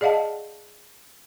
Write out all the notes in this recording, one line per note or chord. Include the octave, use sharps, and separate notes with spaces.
G#4 D5 D#5 F5 F#5 A5